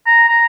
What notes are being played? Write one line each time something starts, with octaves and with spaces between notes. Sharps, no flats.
A#5
A#5